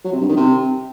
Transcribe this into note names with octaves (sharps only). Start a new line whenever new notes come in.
F#3
C3
G2
D#3
C3